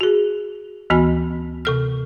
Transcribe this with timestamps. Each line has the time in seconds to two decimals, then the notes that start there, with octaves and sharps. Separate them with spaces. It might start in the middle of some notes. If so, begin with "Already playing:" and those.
0.01 F#4 G#4
0.90 D2 E3 B3 F#4 G#5 B5
1.65 C3 A4 F6